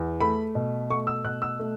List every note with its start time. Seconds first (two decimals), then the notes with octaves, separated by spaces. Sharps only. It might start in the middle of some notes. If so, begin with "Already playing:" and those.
Already playing: E2
0.21 A3 B5
0.55 B2
0.90 A3 C#6
1.07 E6
1.24 B2 F#6
1.42 E6
1.59 A3